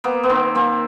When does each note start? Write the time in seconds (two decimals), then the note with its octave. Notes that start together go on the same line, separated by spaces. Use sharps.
0.04 A#3 B3
0.23 B3
0.30 D#3 C4
0.55 A#3 C4